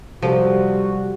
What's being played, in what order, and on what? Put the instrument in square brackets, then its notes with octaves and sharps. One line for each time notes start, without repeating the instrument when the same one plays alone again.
[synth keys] C3 G4 A4 [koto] F3 [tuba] G3 [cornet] F#4